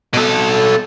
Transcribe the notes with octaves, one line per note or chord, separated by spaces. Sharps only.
B2 A4